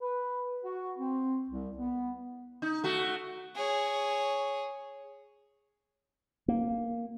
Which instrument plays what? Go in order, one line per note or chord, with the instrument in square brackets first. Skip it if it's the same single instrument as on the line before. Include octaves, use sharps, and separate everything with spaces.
[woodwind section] B4
F#4
C4
C2
B3
[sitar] D#4
A3 F#4
[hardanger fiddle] G#4 C#5
[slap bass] A#3